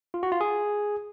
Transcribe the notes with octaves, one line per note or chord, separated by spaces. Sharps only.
F4
F#4
F4
G#4